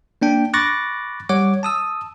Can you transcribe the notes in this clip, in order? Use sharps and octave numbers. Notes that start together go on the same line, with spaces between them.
A#3 D4 G5
B5 C#6 D6 F#6 A6 A#6
G3 C#5 F#5 D6
A5 D#6 E6